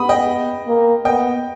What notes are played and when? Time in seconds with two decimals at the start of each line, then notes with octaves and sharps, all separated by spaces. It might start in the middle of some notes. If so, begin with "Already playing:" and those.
Already playing: B3 B5 D#6
0.09 D#5 G5
0.67 A#3
1.05 B3 D#5 G5